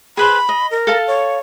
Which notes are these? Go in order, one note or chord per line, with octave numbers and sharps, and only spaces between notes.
G#4 B4 C5 B5
D#5
A#4
A4 F5 A5
C#5